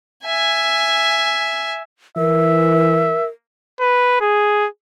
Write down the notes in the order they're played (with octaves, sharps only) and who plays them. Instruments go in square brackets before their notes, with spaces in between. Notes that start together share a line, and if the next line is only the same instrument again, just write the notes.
[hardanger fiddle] E5 G#5
[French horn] E3 [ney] A#4 [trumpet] E5
[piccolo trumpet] B4
G#4